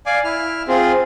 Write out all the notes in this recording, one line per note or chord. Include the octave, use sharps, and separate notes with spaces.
D5 F5 G#5 D6
E4 F6
C4 F4 G#4